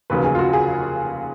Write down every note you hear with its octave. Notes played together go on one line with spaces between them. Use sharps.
F1 D#2 C#3 F#3 B4
G#4
F4
F#4
G#4